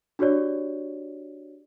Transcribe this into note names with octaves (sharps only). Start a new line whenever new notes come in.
D4 F#4 G4 C#5 D5